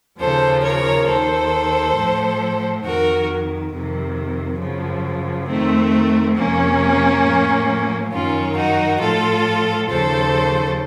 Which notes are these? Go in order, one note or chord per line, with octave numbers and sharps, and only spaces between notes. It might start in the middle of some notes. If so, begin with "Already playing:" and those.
D#2 C#3 F3 A4 C5
A#4 C#5
D#2 D#3 A4 C5
A2 F3
F2 D#3 F#4 A#4
F2 C3 D#3
F#2 C#3 F3
F2 D#3 A3 C4
F2 C3 F3 A#3 C#4
A2 F3
F#2 D#3 C#4 F4
D#4 F#4
A2 F3 F4 A4
D#2 C#3 F3 A4 C5